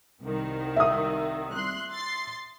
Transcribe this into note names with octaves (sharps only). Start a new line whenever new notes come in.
C2 D#3
E5 D#6
C6 F#6
C6 A6 C7